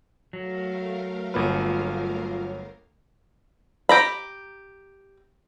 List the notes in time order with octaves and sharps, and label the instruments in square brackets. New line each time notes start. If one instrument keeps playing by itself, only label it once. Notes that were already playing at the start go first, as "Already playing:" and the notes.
[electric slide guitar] F#3 [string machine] A3 A#4 F5
[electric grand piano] G1 A#3 B4 [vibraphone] F4 C#5
[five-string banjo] G4 A#5 B5